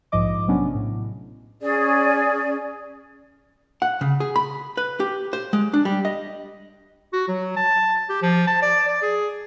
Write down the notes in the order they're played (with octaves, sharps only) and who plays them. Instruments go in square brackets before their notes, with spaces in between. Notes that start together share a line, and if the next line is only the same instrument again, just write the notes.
[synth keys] A#1 G#2 F3 D#5 D6
C3 F#3 B3 C#4 D4
A2
[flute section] C#4 G#4 D5
[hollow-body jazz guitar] F#5
C#3
G#4
B5
B4
G4
C5
G#3
D4
G3
D#5
[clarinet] F#4
F#3
A5
G4
F3
A5
D5
D5
G#4